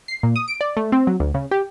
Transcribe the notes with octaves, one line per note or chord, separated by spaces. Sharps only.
C7
A#2
D#6
D7
D5
A3
C4
F#3
D2
C#3
G4